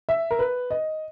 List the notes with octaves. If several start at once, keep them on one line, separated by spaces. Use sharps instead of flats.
E5
A#4
B4
D#5